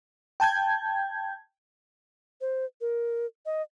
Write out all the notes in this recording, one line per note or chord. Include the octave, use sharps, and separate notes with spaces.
G5 A5 G6 G#6
C5
A#4
D#5